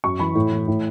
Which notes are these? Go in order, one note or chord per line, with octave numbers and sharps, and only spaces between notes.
F#2 C#6
E3 B5
A2
E3
A2